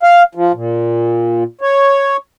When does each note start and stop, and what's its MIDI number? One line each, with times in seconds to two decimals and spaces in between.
0.03 0.23 77
0.35 0.52 53
0.54 1.43 46
1.61 2.17 73